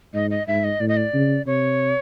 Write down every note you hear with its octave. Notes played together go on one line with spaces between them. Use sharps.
G#2 D#5
D#5
G#2 E5
D#5
A2 D5
D#5
D5
C#3
C3 C#5